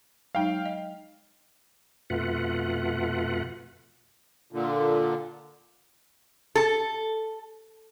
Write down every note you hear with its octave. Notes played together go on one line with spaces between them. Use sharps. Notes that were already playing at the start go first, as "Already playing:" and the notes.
F#3 G#3 D#4 F5 G5
D#5
F2 B2 A3 F4 B4 F#5
A#2 D3
A4